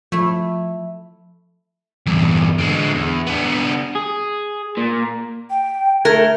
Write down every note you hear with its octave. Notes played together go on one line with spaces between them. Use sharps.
F3 A3 E4
E2 G2
D3 G#3
E2
B3 D4
G#4
A#2
G5
A3 A#4 G#6